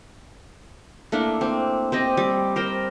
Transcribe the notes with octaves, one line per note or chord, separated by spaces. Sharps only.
A3 A#3 D4 E4
C4
C4 G4 D#5
G3
A#4 C5 G5